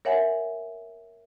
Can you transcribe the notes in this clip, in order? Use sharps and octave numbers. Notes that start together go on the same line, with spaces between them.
A#4 C#5 E5 F#5 G#5